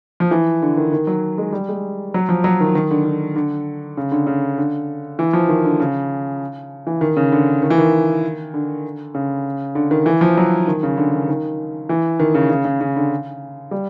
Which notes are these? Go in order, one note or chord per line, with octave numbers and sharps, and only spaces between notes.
F3
E3
D3
D#3
D#3
F#3
G#3
G3
G#3
F#3
F3
F#3
D#3
D#3
D3
D3
D3
C#3
D3
C#3
D3
E3
F3
D#3
D3
C#3
E3
D#3
C#3
D3
D#3
E3
D#3
D3
C#3
D3
D#3
E3
F3
F#3
D#3
C#3
D3
D#3
D#3
E3
D#3
C#3
C#3
C#3
C#3
D3
G3